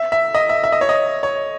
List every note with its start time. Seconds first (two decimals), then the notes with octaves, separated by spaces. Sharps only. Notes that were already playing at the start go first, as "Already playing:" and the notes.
Already playing: E5
0.12 E5
0.35 D#5
0.49 E5
0.64 E5
0.72 D#5
0.81 C#5
0.89 D#5
1.23 C#5